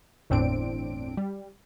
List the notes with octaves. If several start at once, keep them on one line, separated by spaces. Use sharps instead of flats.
G1 E2 A2 C4 D4 D7
G3